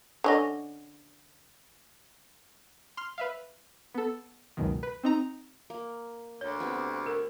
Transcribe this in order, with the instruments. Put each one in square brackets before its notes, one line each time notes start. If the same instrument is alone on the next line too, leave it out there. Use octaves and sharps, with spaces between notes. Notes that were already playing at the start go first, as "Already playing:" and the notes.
[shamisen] D3 C#4 D#5
[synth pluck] C6 F6
B4 E5 F5
B3 A4
C#2 F#2 B2 D#3
B4
C4 D#4 A#5
[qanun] A#3
[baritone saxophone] D2 [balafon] C#5
[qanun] B3 C4 G4
[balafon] A#4